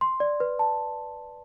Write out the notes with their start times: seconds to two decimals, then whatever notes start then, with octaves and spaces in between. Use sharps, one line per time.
0.01 C6
0.20 D5
0.40 B4
0.59 A5